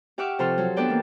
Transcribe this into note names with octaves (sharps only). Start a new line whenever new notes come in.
G4 E5 F#5 C#6 D6 F6
C3 F3 A4 C6 F6
F#3
B3 D4 A4 B4 D5 G5
E3 A#3